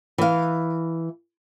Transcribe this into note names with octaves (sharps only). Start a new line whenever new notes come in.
E3 F5